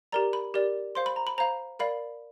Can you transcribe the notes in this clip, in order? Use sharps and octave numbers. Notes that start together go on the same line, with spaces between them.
G4 A#4 D5 A#5
B5
G4 A#4 D5
C5 F5 C6
B5
A#5
B5
C5 F5 A#5
A#4 D5 F5 B5